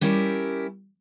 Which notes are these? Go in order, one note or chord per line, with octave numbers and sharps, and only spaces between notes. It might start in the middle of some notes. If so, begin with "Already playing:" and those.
G3 C#4 E4 G4 A#4